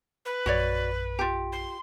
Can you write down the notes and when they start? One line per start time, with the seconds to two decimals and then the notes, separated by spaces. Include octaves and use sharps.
0.25 B4
0.46 A#1 F#2 F#4 C#5 D5
1.19 F4 G4
1.52 C6